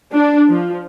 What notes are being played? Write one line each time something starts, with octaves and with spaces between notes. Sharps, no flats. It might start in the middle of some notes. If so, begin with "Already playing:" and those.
D4
F3